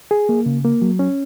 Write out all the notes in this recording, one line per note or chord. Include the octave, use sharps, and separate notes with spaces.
G#4
A#3
C#3
A#3
F#3
C#4